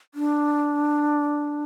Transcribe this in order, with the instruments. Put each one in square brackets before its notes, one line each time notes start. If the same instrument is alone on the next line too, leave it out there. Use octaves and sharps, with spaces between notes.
[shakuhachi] D4